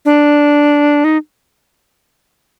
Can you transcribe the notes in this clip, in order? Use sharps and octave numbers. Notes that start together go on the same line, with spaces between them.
D4
D#4